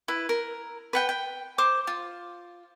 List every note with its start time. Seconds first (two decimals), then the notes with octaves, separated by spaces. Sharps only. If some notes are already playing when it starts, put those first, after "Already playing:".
0.08 E4 B4
0.29 A#4
0.93 B4 F#5 G5
1.09 G5
1.58 C5 D6
1.87 F4